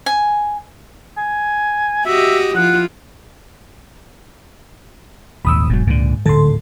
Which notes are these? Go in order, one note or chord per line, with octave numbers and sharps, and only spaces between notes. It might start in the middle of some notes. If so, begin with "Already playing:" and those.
G#5
G#5
F#4 G4 D#5 E5
F3 E4 F4 F#5
D#1 G#1 D#2 G#2 B5 D#6 E6
E1 G#2 B2 F#3
C#2 A#2 D3
D1 G#2 D3 A4 C6